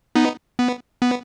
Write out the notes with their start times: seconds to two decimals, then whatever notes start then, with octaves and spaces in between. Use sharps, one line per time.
0.15 B3 D#4
0.59 B3
1.02 B3